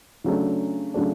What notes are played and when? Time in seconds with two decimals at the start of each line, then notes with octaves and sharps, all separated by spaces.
0.24 C#3 F#3 A3 D4
0.94 C#3 F#3 A3 D4